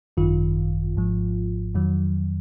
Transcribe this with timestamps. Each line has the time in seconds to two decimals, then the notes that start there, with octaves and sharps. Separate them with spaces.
0.17 G#1 F#2 D#3 F4
0.96 G#1 G#2 F3
1.75 F2 D#3 F#3